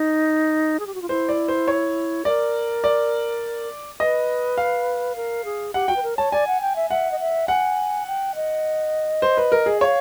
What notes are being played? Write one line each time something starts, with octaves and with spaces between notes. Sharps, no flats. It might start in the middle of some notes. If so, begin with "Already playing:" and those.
Already playing: D#4
G#4
G4
F#4
F4
E4 C5
D5
C5
C#5
A#4 D5
D5
B4 D#5
F5
A#4
G#4
G4 F#5
F#4 G5
B4
A#4
C#5 A5
D5 G#5
F#5
G5
E5
E5 F#5
D#5
E5
F#5 G#5
G5
D#5
C5
B4
A#4
G#4
C#5 F5